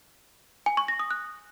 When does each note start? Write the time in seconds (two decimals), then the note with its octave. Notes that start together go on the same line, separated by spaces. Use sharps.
0.66 G#5
0.77 C#6
0.88 A#6
0.99 D#6
1.11 F#6